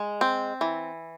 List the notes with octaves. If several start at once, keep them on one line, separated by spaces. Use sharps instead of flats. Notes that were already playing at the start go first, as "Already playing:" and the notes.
Already playing: G#3
C4
E3